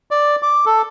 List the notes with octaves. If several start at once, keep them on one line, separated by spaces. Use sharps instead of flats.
D5
D6
A4